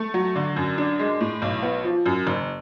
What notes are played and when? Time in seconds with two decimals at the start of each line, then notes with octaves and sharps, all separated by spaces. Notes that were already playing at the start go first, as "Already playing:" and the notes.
Already playing: A3
0.14 F#3
0.36 D3
0.56 F#2
0.78 D4
0.99 G#3
1.21 A2
1.42 B1
1.63 B3
1.84 F3
2.06 F#2
2.27 F#1